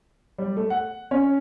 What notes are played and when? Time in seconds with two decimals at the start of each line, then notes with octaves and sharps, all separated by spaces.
0.38 G3
0.57 A3
0.70 F#5
1.11 C#4